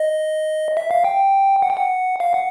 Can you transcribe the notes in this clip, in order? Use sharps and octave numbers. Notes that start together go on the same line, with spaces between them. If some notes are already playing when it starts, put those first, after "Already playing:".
Already playing: D#5
E5
F5
G5
F#5
G5
F#5
F5
F#5